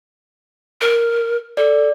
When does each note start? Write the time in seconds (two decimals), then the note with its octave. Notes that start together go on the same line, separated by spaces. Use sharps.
0.81 A#4
1.57 A4 D5